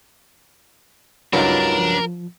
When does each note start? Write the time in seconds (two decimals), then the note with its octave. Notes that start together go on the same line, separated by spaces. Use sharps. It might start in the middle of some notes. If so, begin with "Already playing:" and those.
1.33 C#2 G2 F#3 D4 D#4 F4 A#4 B5
1.78 F3